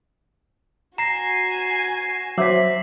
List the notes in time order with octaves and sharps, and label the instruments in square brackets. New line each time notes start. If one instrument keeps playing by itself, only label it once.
[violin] F#4 G#5 [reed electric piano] A#5 [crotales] A#6 C7 E7
[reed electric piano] F#3 C5 [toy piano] C#4 E5 D6 [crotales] E6 B6